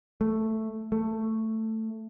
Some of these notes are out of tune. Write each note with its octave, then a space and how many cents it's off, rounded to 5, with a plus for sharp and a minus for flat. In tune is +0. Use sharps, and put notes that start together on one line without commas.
A3 +0
A3 +10